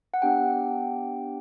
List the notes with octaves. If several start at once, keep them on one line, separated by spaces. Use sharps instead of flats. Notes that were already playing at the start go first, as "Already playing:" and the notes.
F#5
B3 D4 G4 G5